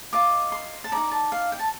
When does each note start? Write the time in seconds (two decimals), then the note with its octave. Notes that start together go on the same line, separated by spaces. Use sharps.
0.13 F4 A#4 D#5 D6
0.52 C6
0.84 A5
0.92 D#4 A4 D5 A#5
1.11 A5
1.32 F5
1.52 G5
1.59 A5